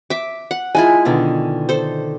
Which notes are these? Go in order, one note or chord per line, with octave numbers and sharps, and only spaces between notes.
E5 D6
F#5
G#3 E4 F4 G#5
B2 D3 D#3
A4 C5